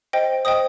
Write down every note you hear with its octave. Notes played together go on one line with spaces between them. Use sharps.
C5 D#5 G5
C5 D#5 G5 D#6